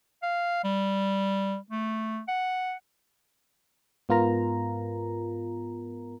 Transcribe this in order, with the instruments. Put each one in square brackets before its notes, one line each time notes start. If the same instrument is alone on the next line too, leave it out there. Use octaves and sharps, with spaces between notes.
[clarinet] F5
G3
A3
F#5
[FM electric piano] G#2 B3 F4 A#4 A#5